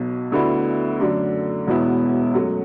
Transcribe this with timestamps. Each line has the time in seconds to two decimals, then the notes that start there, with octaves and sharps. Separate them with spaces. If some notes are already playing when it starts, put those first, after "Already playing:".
Already playing: B1 B2 F#3
0.32 D2 D3 B3 E4
1.00 F#2 D3 A3 D4
1.67 E1 E2 B2 B3 E4
2.34 F#2 F#3 A3